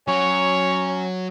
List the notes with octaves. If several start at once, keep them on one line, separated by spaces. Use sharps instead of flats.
F#3 C#4 C#5